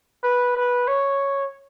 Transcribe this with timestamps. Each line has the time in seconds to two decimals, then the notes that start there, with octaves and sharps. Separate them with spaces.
0.24 B4
0.57 B4
0.87 C#5